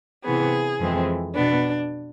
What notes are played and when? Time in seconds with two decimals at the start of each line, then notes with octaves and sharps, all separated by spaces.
0.24 C3 E3 B3 G#4
0.80 F2 E3 G#3 C4
1.34 B2 B3 D4